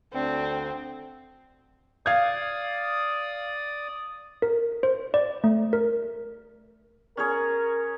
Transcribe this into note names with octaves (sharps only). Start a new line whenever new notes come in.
D2 D3 C4
D5 F5 D#6 G#6
A#4
C5
D5
A3
A#4
C#4 G#4 A#4 C#5